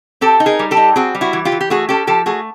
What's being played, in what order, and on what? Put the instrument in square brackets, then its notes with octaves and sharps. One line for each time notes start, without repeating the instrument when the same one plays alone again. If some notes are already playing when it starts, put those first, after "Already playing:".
[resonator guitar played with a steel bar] C4 G4 A4
D#4
G#4 A#4
G3
G4 A4
D#4
C4 F#4 G#4
G3
E4 F#4
E3
F4 G4
E3
G4
A3 F#4 G#4
C#4 G4 A4
F3 G4 A4
A3 F#4 G#4